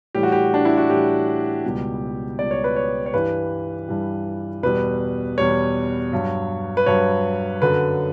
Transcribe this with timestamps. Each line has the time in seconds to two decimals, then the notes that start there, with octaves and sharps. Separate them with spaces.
0.15 A2 E3 G3 G4
0.23 F#4
0.32 G4
0.54 D4
0.65 E4
0.77 F#4
0.89 A2 E3 G3 G4
1.64 C#2 B2 G3
2.39 C#2 B2 G3 D5
2.51 C#5
2.64 B4
2.76 C#5
3.06 C#5
3.14 G2 E3 G3 B4
3.88 G2 E3 G3
4.63 E2 B2 G3 B4
5.38 E2 B2 G3 C#5
6.13 G2 F#3
6.77 B4
6.86 G2 F#3 C#5
7.62 F#2 D3 F#3 B4